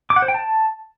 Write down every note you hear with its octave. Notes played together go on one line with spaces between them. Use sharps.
D6
F#5
C5
G5
A5